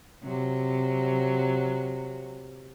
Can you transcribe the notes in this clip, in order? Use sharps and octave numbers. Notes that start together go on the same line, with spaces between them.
C3 F#3